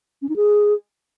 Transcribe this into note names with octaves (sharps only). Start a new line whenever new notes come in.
C#4
D#4
G#4